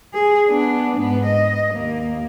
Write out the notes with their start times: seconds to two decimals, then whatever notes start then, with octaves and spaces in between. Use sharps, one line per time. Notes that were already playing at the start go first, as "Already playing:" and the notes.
0.14 G#4
0.49 B3 D4
0.97 G#2 B3
1.27 D#5
1.74 D#2 A#3